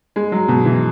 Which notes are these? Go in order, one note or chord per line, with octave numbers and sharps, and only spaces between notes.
G#3
F#3
B2
E3